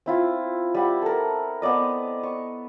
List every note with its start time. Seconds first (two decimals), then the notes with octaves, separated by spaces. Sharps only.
0.06 C4 E4 F4
0.74 G3 F#5
1.02 A4 A#4
1.62 B3 C4 D5 D#5
2.23 C#6